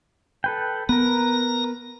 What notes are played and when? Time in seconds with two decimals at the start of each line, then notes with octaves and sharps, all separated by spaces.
0.44 A4 B4 G5
0.89 B3 A#4 B4 A#5